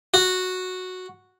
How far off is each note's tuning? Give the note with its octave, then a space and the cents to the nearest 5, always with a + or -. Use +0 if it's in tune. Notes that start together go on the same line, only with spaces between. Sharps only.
F#4 -5